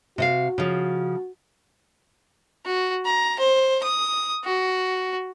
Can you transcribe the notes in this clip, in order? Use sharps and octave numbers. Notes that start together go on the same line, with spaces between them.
C3 F#4 D#5 F5
C#3 F3
F#4
A#5
C5
D#6
F#4